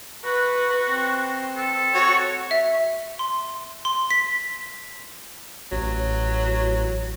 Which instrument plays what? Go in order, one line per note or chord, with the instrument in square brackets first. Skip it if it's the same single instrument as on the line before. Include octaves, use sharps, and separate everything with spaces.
[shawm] F#4 [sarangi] B4
[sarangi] C4
[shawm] A4
[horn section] F#4 C#5
[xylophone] E5
C6
C6
B6
[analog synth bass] A1 [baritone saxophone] F#3